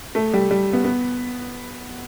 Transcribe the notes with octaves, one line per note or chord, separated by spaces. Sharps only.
A3
G3
G3
B3
B3